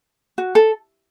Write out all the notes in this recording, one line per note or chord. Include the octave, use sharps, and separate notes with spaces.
F#4
A4